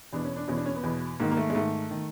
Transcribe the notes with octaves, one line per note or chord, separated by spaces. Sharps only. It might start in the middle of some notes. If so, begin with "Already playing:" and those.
E2 B2 D4
C#4
D4
E2 B2 C#4
D4
C#4
B3
E2 B2
G#2 D#3 A#3
A#3
A3
G#3
G#2 D#3 A3
D#3